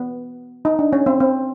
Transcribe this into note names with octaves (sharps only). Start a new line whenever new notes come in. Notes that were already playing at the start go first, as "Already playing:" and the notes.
Already playing: B3
D#4
D4
C#4
C4
C4